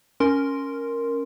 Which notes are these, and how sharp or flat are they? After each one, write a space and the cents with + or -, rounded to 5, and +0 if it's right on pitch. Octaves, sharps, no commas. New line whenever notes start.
C#4 +0 A#4 +0 C6 +0